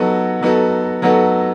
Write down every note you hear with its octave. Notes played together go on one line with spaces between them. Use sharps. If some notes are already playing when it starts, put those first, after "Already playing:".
Already playing: F#3 B3 D#4 F#4 A4
F#3 B3 D#4 F#4 A4
F#3 B3 D#4 F#4 A4